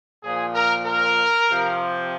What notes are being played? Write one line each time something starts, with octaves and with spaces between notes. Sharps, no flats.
A#2 F3 G#4
A#4
A#4
C3 F3